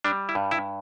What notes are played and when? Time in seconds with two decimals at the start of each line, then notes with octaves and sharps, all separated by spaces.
0.04 G3 D4
0.29 E4
0.35 G2
0.51 E4